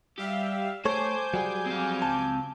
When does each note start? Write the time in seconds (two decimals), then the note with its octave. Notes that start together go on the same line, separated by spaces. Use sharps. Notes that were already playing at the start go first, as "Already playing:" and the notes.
0.18 G3 G4 E5 F5
0.85 A3 A4 C5 C#5 G#5 D6 G6
1.34 F#3 G3 G#4
1.67 C4 F5
2.02 C#2 A5